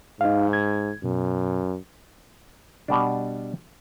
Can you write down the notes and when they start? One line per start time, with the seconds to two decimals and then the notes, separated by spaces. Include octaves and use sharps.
0.21 G#2 D#4 F5
0.53 G#6
1.04 F#2 B2
2.88 B2 G3 D4